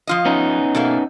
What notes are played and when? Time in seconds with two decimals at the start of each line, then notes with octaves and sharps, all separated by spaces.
0.07 F3 F4 D#5
0.25 B3 C#4 D#4
0.75 B2 A3 A#3